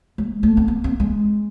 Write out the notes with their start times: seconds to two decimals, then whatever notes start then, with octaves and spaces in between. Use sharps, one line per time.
0.18 G#3
0.43 A3
0.57 C4
0.68 B3
0.84 C4
1.00 G#3